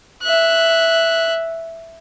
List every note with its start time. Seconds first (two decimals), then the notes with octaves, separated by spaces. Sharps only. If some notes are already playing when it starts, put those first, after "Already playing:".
0.23 E5 F#6